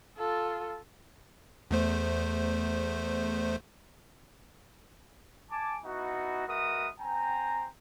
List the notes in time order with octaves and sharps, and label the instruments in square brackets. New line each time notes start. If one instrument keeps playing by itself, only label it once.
[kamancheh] F4 A4
[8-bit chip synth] E2 A3 C5
[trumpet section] G#5 A5 D6
B3 D#4 E4 F#4
G#3 F#4 A#4 B4 E5 D#6
C4 G5 G#5 A#5